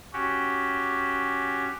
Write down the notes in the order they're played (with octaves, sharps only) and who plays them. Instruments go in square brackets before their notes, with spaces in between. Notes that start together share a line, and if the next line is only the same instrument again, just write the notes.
[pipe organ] C#4 F#4 G4